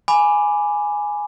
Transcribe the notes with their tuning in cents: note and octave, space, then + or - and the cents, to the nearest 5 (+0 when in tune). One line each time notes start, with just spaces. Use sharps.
G#5 +0 B5 +0 D6 +0